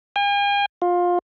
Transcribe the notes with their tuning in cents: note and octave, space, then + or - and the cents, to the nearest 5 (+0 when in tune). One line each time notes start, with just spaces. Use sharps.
G#5 -45
F4 +20